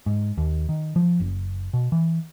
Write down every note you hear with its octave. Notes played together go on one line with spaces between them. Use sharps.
G#2
D#2
D#3
F3
F#1
B2
E3